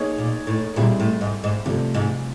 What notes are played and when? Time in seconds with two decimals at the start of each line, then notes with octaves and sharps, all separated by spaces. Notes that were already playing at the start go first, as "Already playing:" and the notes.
Already playing: A#3 D#4 G#4 C#5
0.18 A#2
0.47 A2
0.76 A#2 G3 C4 E4 G#4
1.00 A2
1.21 G#2
1.44 G#2
1.65 G2 C3 F3 A3
1.94 G#2